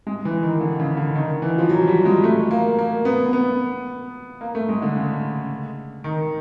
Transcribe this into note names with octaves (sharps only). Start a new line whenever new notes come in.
G#3
E3
D#3
D3
C#3
D3
D#3
E3
F3
F#3
G3
G#3
A3
A#3
A#3
B3
B3
A#3
A3
G#3
D3
C#3
D#3